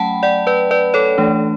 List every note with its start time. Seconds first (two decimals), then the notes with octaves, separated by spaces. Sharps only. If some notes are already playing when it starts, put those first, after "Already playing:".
Already playing: F#3 A3 C#4 F#5 G5 A5 B5
0.23 D5 F#5
0.47 B4 D5
0.71 B4 D5
0.94 A4 C#5
1.18 E3 A3 D4